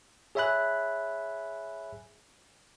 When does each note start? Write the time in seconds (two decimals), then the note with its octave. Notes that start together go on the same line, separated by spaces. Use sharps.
0.35 G#4 C#5 E5 G#5 B5 F#6